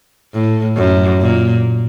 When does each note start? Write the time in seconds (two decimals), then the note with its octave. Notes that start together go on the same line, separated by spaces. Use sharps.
0.33 A2
0.77 F#2
1.21 A#2